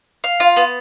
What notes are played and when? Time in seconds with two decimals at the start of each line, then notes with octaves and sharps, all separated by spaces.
0.24 F5
0.40 F4
0.56 B3